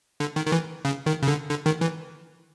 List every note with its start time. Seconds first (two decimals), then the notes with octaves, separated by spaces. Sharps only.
0.20 D3
0.36 D#3
0.47 D#3
0.52 E3
0.85 C#3
1.06 D#3
1.23 C#3
1.28 D3
1.49 D3
1.66 D#3
1.81 E3